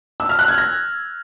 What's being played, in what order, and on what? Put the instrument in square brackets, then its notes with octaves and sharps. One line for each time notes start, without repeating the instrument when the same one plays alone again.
[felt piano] E6
F6
F#6
G#6
A#6